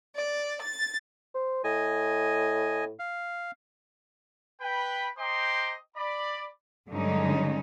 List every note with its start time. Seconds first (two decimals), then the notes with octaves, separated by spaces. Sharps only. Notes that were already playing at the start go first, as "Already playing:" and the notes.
0.16 D5
0.61 A6
1.35 C5
1.64 A2 D#5 G#5
2.99 F5
4.61 B4 G5 B5
5.18 C5 D#5 G5 A#5 C6 D6
5.97 D5 B5
6.91 G2 D3 F#3 G#3 C#4 D#4